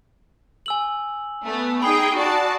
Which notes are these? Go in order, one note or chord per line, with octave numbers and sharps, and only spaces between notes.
G#5 E6 F#7
A3 B3
D#4 G#4 G5 B5 D#6 C7
F#4 D5 A5